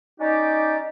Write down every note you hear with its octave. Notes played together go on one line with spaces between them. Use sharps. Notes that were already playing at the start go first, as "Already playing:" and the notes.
C#4 D#4 G4 D5 D#5